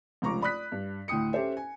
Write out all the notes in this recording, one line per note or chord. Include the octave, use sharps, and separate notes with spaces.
F1 C#2 A#5 C#6 D6
D5 B5 D#6 F#6 B6
G2
D2 A2 G5 D#6 C#7
C#4 G4 A4 C5 E5
G#5